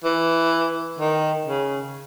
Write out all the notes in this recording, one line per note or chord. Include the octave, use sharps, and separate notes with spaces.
E3
D#3
C#3